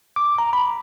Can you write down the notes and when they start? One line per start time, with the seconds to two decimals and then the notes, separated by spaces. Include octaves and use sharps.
0.16 D6
0.38 A#5
0.53 B5